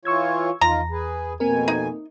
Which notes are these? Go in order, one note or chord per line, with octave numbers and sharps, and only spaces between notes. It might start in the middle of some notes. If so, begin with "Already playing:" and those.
E3 F4 C#5 C#6 E6 G#6
E2 D#3 F4 A#5
G#4 B4
F2 B2 A#3 C4 A#4 G#5
D#4